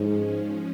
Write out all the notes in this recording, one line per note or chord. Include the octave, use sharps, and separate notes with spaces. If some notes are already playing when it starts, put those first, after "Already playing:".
Already playing: G#2 F3 G#3 C#4